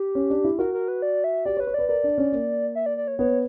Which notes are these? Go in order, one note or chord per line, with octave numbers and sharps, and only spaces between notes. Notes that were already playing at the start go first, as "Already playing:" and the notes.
Already playing: G4
C#4
D4
E4
F#4 A#4
A#4
B4
D5
E5
G4 D5
C#5
B4
C#5
B4 D5
A#4 D5
D4
C#4
A#3
E5
D5
D5
C#5
B3 C#5